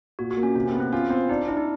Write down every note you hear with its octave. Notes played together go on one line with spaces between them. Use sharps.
A#2 F#4
F#4
A#3
C#4
C3 C#4
C4
B3
C4
C#4 F4
C4
D4 D#4
D4 E4
D#4